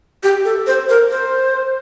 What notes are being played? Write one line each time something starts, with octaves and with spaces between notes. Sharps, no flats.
G4
A4
C5
A#4
C5